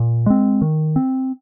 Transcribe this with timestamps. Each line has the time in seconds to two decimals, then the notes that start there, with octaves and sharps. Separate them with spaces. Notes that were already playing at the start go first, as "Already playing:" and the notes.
Already playing: A#2
0.26 G#3 C4
0.62 D#3
0.96 C4